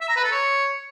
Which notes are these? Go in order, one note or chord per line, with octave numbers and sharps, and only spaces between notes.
E5
A#5
B4
A4
C#5